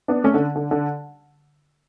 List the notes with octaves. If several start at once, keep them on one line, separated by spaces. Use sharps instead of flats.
B3 D4
A3 C#4
D3
D3
D3